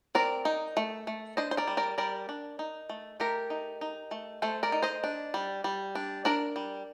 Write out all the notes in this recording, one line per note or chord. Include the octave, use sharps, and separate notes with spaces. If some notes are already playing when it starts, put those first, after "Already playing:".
C4 A#4 D5
D#4
A3
A3
D4 C5 D#5
C5
A#4 D5
G3
A#4 D5
G3 A#4 D5
D4
D#4
A3
A3 G4 A#4
D#4
D#4
A3
A3 A4 C5
A#4 D5
D#4
C5 D#5
D4
G3
G3
D4
D4 A#4 D5
G3